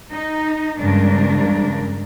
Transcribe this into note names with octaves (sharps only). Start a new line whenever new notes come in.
D#4
E2 G2 C#3 G#3 D4 A#4